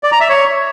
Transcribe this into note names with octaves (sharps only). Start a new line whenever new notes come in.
D5
A#5
E5
C#5